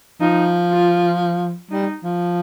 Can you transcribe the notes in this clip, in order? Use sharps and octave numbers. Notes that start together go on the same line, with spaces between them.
F3 D#4
F4
G3 D#4
F3